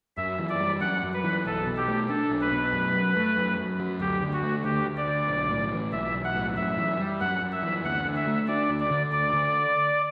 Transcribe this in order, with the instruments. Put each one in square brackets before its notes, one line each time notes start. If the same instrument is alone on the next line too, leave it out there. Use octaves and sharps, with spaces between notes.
[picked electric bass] F#2 [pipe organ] E5
[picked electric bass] E3
[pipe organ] D5
[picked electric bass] G3
[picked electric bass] F#2 [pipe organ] F#5
[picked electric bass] F#2
[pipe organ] B4
[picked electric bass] E3
[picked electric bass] B1 [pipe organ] A4
[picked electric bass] B2
[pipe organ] G4
[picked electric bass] A3
[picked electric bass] D4 [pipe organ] A4
[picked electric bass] B1
[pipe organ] B4
[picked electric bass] B2
F#2
F#3
A3
F#2
F#2
F#3
[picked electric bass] D2 [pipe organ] G4
[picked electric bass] D3
[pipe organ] F#4
[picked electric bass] A3
[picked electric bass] D2 [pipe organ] G4
[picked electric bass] D2
[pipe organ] D5
[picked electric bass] D3
B1
A2
E3
[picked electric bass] B1 [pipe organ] E5
[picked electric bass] B1
[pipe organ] F#5
[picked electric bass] A2
[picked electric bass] F#2 [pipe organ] E5
[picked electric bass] E3
G3
[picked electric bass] F#2 [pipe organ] F#5
[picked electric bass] F#2
[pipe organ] E5
[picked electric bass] E3
[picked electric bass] D2 [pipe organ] F#5
[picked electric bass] D3
[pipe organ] E5
[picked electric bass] A3
[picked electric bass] D4 [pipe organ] D5
[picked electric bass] D2
[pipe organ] D5
[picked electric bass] D3
[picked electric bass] D2 [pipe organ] D5
[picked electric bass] D3